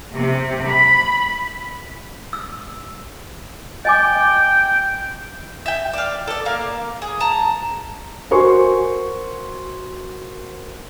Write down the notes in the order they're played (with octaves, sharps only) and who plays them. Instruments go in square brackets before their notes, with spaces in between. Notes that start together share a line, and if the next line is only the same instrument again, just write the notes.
[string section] C3
B5
[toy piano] E6
[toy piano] D#5 G#5 D6 [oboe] G5
[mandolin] E5 G5
D5 F5
A4 D5
A#3 F5
G#4
A5 A#5
[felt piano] F#4 A#4 C5 G#5 C6 C#6